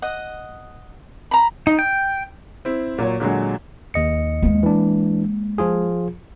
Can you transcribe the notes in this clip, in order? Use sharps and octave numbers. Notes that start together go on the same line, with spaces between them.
D#5 F#5
A#5 B5
D#4
G5
C4 E4
A#2 F#3 C#5
A#2 D3 F#3 G#3
D#2 D#5 C#7
G#3 A#3
E3 D4
F3 F4 G#4